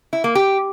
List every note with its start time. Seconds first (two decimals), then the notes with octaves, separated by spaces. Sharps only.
0.13 E4
0.24 A#3
0.35 G4